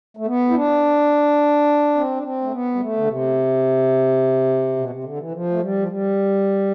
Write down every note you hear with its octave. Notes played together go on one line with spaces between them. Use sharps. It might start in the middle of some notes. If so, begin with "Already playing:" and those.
A3
B3
E4
D4
C4
D4
C4
A3
B3
G3
A3
D3
C3
B2
C3
D3
E3
F3
A3
G3
F3
G3